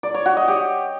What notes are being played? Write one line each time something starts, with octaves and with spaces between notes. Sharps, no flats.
D5
C#5
F#4
D#5
G4